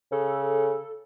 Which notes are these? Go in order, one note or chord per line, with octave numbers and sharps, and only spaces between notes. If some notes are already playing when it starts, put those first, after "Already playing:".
C#3 A4